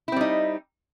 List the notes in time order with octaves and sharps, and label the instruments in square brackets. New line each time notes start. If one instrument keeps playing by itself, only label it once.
[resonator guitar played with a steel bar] E4
C4
G3
D#4